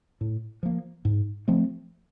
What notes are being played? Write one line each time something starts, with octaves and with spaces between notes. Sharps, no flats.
A2
F3 A#3
G#2
F3 A3 C4